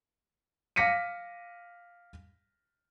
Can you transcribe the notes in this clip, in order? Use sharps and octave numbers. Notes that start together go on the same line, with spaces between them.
F5 D6 A#6 B6 C#7 D#7